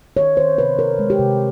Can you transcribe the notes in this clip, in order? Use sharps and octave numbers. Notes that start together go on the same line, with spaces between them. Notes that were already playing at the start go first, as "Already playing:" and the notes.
D#3 C#5
D#3 C5
C3 B4
C3 A#4
G#3
G4
C3